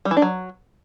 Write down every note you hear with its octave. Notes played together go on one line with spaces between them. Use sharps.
G3
E3
D4
F#3